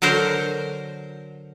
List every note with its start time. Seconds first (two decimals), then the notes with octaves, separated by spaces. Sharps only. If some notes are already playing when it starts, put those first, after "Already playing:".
0.02 D3 F#3 A#4 C5